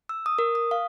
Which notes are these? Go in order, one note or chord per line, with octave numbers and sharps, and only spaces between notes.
E6
D#6
A#4
D#6
F5